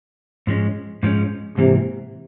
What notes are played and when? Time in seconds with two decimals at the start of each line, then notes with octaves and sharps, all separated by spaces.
0.47 G#2 F3 G#3 C#4
1.03 G#2 F3 G#3 C#4
1.58 G#2 C3 E3 A#3